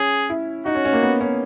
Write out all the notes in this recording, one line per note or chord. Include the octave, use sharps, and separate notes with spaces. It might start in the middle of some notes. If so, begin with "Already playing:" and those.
Already playing: C#4 G#4
E4
D#4 F#4
C#4
C#4
A#3
B3
C#4